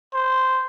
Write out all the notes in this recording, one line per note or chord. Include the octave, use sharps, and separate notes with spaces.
C5